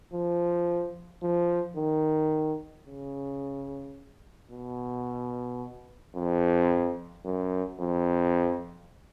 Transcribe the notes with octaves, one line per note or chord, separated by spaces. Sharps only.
F3
F3
D#3
C#3
B2
F2
F#2
F2